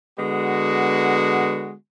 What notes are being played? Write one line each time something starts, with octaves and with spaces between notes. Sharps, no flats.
D3 G#3 B3 F#4